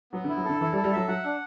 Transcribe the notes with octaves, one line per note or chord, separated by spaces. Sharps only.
F#3 B3
D3
E4
F#3
D3 A4
E3 E4
G3
A4
G3
F#3 E5
F#3 F#5
D4